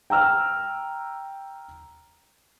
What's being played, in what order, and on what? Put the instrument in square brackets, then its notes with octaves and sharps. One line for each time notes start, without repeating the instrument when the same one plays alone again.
[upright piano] G5 A#5 E6 F6